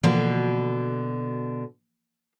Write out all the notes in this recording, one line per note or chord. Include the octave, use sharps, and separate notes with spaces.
B2 D3 E3 F3 A#3